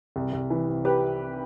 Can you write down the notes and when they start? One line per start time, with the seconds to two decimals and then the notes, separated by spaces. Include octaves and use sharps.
0.16 C2
0.33 C2
0.50 E3
0.68 C3
0.85 G4 B4